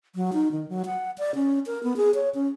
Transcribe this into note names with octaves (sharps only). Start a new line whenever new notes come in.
F#3
D#4
D#3
F#3
F#5
D5
C#4
A#4
B3
G#4
C#5
C#4